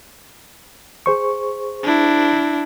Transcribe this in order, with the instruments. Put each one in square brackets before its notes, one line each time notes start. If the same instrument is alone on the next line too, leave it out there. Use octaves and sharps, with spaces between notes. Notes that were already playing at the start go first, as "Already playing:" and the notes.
[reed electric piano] G#4 C5 C#6
[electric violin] D4 E4